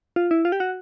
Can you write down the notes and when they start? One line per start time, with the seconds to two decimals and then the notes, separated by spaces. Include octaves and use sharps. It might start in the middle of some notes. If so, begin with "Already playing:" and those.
0.16 F4
0.31 E4
0.45 F4
0.52 G4
0.60 F#4